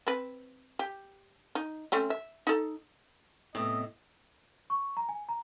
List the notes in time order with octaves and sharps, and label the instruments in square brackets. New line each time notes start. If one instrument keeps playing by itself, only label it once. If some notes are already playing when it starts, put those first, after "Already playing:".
[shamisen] C4 B4
G4
D#4
A3 C4 C#4
E5
D#4 A4
[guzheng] A2 [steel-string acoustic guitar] C3 [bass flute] B3 [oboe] D#5
[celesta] C#6
A#5
G#5
A#5